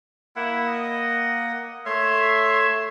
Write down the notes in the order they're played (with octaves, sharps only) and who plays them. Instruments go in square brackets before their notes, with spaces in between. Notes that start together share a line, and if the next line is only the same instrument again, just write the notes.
[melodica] A#3 F#5 [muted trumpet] E4
[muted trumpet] D#5
[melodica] A3 C#5 C6 [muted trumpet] E5